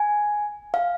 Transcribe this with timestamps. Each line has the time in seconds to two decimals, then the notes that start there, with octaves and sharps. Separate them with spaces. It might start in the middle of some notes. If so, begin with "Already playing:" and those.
Already playing: G#5
0.74 F5